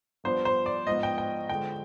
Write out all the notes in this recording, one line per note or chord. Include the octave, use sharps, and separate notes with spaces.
G2 F3 B3 D4 C5
C5
D5
G#2 F3 B3 D#5
G5
G5
D3 F3 G#3 G5